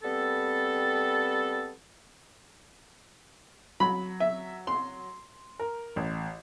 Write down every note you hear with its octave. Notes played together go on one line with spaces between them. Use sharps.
G3 B3 C4 A4
F#3 B5
E5
C6
A#4
A1